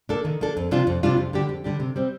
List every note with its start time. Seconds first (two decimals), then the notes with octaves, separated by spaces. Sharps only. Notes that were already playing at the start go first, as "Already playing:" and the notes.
0.09 A#3 D4 A4
0.25 D#3
0.41 A#3 D4 A4
0.57 F2
0.71 C3 G3 D4 F4
0.87 F2
1.03 C3 G3 D4 F4
1.17 F2
1.33 D3 G3 D4 G4
1.49 F2
1.64 D3 G3 D4 G4
1.80 C3
1.96 G3 C4